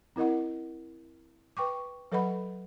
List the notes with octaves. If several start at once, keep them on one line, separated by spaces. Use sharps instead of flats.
C4 E4 A#4 D#5 F#5
B4 G5 C#6 D6
F#3 A4 B4 D#5 F#5 B5